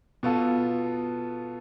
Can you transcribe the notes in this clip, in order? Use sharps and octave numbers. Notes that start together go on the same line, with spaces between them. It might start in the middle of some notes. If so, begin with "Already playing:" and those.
B2 B3 F4 A4